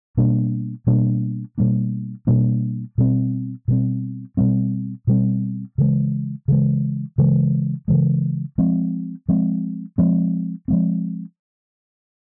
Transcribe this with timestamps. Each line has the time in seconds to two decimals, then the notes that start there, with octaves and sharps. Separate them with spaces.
0.17 B2 G3 A#3 D4
0.87 B2 G3 A#3 D4
1.58 B2 G3 A#3 D4
2.27 B2 G3 A#3 D4
2.98 B2 G3 C4
3.68 B2 G3 C4
4.37 B2 G3 C4
5.07 B2 G3 C4
5.78 C#3 E3 G#3
6.48 C#3 E3 G#3
7.18 C#3 E3 G#3
7.88 C#3 E3 G#3
8.58 F3 G#3 C4
9.29 F3 G#3 C4
9.98 F3 G#3 C4
10.68 F3 G#3 C4